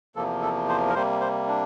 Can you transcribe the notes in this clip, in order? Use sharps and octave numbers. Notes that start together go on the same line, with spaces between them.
E2 C3 F3 A#3 A4
A4
C5
A#4
C3 G3 A#3 C5
C5
D4